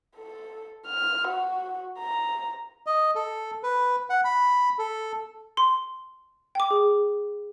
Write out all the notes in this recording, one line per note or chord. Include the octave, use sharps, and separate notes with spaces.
A4
F6
F#4
A#5
D#5
A4
B4
F#5
B5
A4
C6
G5 D6
G#4